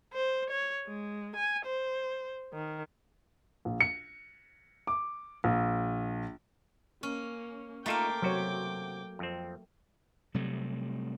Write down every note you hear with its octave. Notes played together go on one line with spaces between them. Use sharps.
C5
C#5
G#3
G#5
C5
D#3
A#1
C#7
D6
A#1
A#3 C#4
A3 A#3 D#4 F4 A4 F5 G5 D6
C3 F#3 F#4 C#5
F2 C4
C3 F#3 G3 A3